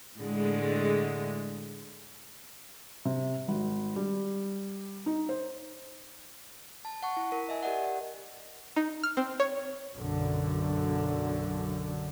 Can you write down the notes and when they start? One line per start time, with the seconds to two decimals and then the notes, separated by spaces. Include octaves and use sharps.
0.17 A2 D3 G#3
3.05 C3
3.48 G#1
3.96 G3
5.06 D#4
5.29 C5
6.85 A5
7.03 F#5 A5 C#6
7.17 E4
7.32 E4 A#4
7.49 D#5 E5 G#5
7.63 G4 A#4 D5 D#5 F#5
8.76 D#4
9.03 F6
9.17 C4
9.40 C#5
9.94 B1 F#2 D3